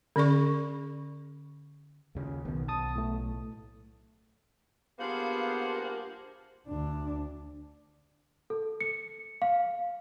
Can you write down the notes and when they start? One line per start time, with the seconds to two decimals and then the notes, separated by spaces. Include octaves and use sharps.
0.16 D3 C#4 G#4 D5 B5 C#6
2.15 D#2 C#3
2.45 B1 B2 D#3
2.68 B1 A5 D#6
2.96 A2 A3
4.99 G2 F3 A#3 B3 G#4 C5 F5 F#5
6.67 D2 D4
8.50 A4
8.81 C#7
9.42 F5